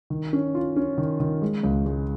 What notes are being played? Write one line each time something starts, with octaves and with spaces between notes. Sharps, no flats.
D#3
C#4
F4
C#4
D#3
D#3
G#3
C#2
G#3